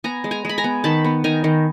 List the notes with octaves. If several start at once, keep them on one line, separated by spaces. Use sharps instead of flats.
B3 G#5 A#5
G#3
G#5 A#5
G#3 B5
G#5 A#5
B3
D#3 A5 B5
B3
D#3 G#5 A#5
D#3